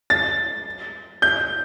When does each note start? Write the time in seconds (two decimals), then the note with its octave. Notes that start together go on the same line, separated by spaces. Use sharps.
0.10 A6
1.22 G6